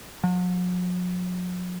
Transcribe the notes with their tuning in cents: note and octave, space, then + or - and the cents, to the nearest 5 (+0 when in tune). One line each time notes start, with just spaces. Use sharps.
F#3 -45